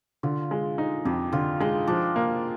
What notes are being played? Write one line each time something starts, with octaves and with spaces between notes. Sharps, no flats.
D3 F4
G#3
D#4
F2 G4
D3 F4
G#3 D#4
F3 D4
A#3